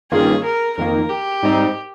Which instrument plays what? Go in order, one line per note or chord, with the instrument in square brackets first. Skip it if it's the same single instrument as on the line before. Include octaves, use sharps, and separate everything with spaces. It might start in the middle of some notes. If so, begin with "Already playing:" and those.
[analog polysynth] G2 D#3 A#3 C#4 F4 [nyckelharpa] G#4
[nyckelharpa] A#4
[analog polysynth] F2 D#3 A#3 [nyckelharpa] A#4
[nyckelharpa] G4
[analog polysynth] G#2 G3 C4 D#4